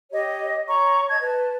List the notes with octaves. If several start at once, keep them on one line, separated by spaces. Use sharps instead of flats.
G4 C#5 D#5
C#5 A#5 C#6
D#5 A5 G#6
B4 A5